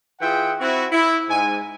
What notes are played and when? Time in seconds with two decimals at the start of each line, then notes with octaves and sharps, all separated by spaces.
0.21 E3 F4 G#4 E5 F#5 G5
0.60 C4 E4 F#4
0.91 E4
1.29 G#2 G#5